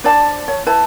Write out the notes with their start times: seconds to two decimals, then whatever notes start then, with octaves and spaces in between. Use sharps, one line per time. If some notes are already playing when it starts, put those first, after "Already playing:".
0.04 D4 C5 D5 A5
0.48 C#5
0.66 E4 B4 A5